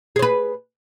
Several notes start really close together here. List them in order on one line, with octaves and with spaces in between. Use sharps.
G#4 C5 B4